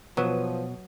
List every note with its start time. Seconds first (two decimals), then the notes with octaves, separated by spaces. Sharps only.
0.17 B2 F3 F#3 B4 D#6